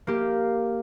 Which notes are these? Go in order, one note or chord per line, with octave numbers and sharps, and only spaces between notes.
A#3 G4